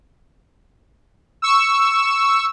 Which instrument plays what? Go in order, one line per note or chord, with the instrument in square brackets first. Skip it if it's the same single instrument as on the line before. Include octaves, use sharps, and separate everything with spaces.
[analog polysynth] C#6 E6